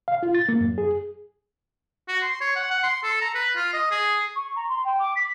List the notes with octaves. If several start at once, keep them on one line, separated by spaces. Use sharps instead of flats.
F5
F4
A6
A#3
F#2
G#4
F#4
C6
C#5
F#5
F#5
C6
A4
A#5
B4
F4
D#5
G#4
C#6
A#5
C6
G5
D6
B6